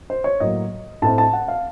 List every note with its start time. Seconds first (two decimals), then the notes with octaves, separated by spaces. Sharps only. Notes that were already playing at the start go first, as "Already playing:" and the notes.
0.10 C5
0.24 C#5
0.40 A2 F#3 A#3 D#5
1.02 A2 A3 C4 A5
1.18 A5
1.33 F#5
1.48 F5